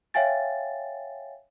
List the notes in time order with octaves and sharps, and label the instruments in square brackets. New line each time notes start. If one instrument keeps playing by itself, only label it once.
[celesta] C#5 E5 F5 G5 G#5 A6